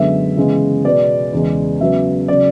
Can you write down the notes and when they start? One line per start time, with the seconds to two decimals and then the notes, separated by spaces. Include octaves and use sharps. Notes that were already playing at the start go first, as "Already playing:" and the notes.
Already playing: F#2 D3 G#3 B3 E5
0.37 C#3 E3 G#3 B3
0.85 B2 G#3 B3 D5
1.33 E2 C#3 G#3
1.81 C#3 F#3 B3 E5
2.28 C#3 F#3 D5